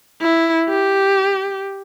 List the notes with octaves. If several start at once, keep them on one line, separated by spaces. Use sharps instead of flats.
E4
G4